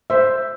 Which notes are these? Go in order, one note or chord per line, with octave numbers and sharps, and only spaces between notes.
C5 E5